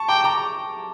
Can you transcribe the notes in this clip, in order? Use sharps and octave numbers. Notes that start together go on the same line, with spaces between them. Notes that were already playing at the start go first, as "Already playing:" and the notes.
Already playing: A5 C#6
G5 A#5 D6
A#5 D6